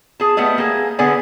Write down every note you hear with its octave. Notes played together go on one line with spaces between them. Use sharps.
G#4 A5
G3 A3 B3 D#5
A#3 G#4
D3 B3 G#4 D5 G#5